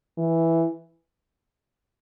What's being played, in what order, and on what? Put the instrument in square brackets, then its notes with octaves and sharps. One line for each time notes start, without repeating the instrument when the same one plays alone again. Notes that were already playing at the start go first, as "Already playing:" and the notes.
[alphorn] E3